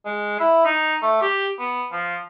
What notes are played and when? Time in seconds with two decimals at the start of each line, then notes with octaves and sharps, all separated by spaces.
0.06 G#3
0.40 E4
0.65 D#4
1.02 A3
1.22 G4
1.59 B3
1.92 F3